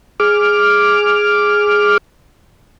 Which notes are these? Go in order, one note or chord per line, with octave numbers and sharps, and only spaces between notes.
G#4 D6 F6